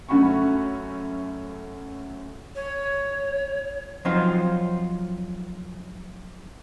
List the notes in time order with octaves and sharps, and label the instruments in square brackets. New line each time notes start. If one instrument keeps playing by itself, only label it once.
[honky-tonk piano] F#2 A3 C#4 F#4 B5 C#6
[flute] C#5
[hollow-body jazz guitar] F3 F#3 C4 D#4 F4 C5